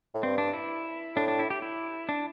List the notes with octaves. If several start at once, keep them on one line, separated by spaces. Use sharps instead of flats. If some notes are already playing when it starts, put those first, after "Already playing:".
A2
G2 C4
D4
E4
A2 D4
D4
E4
G4
E4
D4